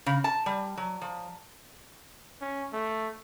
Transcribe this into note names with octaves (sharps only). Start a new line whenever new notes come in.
C#3
A5
G3
F#3
F3
C#4
A3